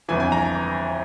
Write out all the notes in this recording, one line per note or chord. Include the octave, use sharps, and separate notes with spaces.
G1 F2 E3 G#5
G#5
A#5